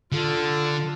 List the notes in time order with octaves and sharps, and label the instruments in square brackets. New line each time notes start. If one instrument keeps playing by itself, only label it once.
[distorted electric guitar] D3 [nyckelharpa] F4 A4